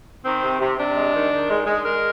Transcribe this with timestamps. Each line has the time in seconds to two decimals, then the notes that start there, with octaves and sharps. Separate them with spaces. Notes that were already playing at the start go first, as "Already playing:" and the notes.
0.24 D#3 C4
0.42 C3
0.60 C3
0.78 C3 D4
0.95 G#3
1.13 D#3
1.31 D#3
1.49 G#3
1.67 G#3
1.85 G#3 A#4